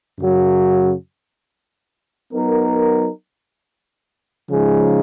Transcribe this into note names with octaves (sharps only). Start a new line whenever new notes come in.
F#2 C#3 F#3
F#3 B3 D#4 A#4
C#3 F3 G#3 D#4 G#4